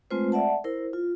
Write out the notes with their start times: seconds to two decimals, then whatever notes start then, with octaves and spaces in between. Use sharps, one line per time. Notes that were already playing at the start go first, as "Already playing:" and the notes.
0.11 G#3 A3 C4 F4 B4 C5
0.32 D5 E5 F#5 A5
0.64 E4 A#4 C5
0.93 F4